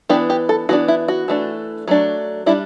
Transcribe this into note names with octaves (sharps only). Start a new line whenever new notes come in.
E3 B3 D4 G4
G4
A4
E3 B3 D4 F#4
E4
F#4
E3 A3 D4
F#3 A3 D4
G3 D4 E4